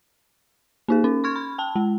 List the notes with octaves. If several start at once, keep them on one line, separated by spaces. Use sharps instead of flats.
A#3 D#4 G#4
C#4
C6 C#6 F6 G#6
B5
G5 A5
G#3